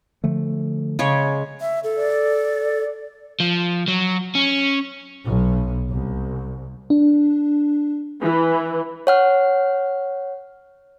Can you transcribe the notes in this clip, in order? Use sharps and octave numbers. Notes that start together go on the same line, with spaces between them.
D3 F3 A3
C#3 G#3 C#5
E5
A4
D5
F3
F#3
C#4
B1
C2
D4
E3
C#5 F#5 F6